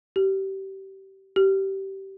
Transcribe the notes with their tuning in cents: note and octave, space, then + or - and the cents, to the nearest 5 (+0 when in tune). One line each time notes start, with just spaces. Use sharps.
G4 -25
G4 -20